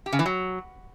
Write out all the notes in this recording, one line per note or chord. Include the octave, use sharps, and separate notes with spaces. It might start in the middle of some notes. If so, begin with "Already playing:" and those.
G4
C#3
E3
F#3